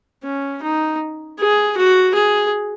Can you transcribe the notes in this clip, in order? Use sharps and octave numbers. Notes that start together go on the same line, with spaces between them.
C#4
D#4
G#4
F#4
G#4